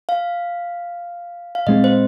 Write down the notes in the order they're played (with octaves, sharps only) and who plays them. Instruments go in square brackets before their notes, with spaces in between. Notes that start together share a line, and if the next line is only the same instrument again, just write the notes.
[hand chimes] F5
F5
[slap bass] A#2 G#3 C4 [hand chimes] D#5
[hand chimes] C5